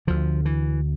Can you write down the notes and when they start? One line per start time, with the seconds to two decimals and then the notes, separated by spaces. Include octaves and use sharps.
0.07 D2 D3 F3
0.45 E3